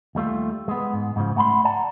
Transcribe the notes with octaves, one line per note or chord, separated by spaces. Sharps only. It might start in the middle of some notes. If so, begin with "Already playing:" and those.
D#2 G3 A3 F4
G#3 B3
G#2
G#2 C#3 F3
A3 F#5 A5 B5 C6
D5 F#5 A5 A#5